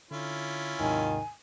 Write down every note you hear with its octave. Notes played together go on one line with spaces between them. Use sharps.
D3 C#4 E4 F4
D#2 G#2 C3 D#3 G#5